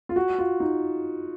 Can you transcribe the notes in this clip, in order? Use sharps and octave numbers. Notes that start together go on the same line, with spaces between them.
F4
F#4
F4
D#4